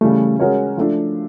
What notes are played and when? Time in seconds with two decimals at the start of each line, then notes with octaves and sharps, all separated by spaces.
0.01 C#3 E3 G3 A3
0.40 G#3 C#4 F#4 A#4 C#5
0.77 F3 A3 D4